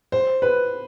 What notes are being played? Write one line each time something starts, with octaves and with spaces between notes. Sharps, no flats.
C5
B4